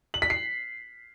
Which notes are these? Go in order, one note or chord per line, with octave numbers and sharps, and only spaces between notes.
F#7
B6
C7